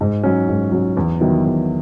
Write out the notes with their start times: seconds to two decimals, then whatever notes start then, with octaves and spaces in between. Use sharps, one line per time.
0.01 G#2
0.23 F#3 C#4
0.49 G#2
0.72 F#3 C#4
0.97 E2
1.20 D#3 F#3 B3 E4
1.45 E2